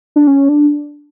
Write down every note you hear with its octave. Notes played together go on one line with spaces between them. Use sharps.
D4
C#4
D4